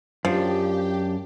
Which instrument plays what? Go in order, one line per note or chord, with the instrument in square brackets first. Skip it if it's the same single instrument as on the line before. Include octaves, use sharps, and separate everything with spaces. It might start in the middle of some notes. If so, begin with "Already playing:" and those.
[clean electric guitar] F#2 D4 [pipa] F3 [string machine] G4